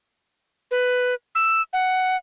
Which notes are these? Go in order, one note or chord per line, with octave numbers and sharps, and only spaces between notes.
B4
E6
F#5